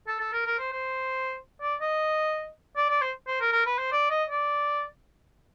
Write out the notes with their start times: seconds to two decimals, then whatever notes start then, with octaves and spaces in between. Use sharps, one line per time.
0.08 A4
0.20 A4
0.33 A#4
0.46 A#4
0.59 C5
0.72 C5
1.62 D5
1.81 D#5
2.76 D5
2.90 D5
3.01 C5
3.27 C5
3.41 A#4
3.53 A#4
3.66 B4
3.78 C5
3.92 D5
4.10 D#5
4.30 D5